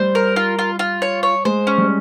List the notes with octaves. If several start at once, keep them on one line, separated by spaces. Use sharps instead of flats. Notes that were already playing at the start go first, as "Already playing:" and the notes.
Already playing: G3 C5
A#4
F4
F4
F4
C#5
C#5
G#3 C5
C#4
G3